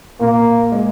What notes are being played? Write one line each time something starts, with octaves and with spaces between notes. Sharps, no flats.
A#2 A#3
G#3